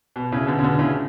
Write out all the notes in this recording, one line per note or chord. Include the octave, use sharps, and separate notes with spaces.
B2
A2 C#3
B2 D3
C#3
B2 D3
A2 C#3